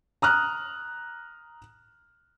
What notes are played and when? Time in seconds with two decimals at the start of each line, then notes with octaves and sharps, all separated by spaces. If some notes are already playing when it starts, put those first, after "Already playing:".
0.22 A#5 D#6 F6 F#6